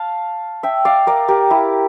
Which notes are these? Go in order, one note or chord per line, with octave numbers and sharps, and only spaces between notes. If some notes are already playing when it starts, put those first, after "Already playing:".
Already playing: F5 A5
E5 G5
D5 F5
A#4 D5
G4 A#4
E4 G4